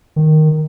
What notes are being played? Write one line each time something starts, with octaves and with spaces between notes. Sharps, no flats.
D#3